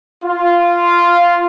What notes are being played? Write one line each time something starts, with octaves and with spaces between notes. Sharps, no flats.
F4